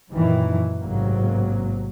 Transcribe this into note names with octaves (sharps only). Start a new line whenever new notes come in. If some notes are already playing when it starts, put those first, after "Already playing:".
F#2 A#2 D#3 E3
A1 G#2 C3 F#3 A#3